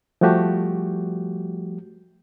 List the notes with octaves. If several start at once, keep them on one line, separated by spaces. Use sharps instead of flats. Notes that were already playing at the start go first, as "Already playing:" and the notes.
F3 G3 A3 F#4 G4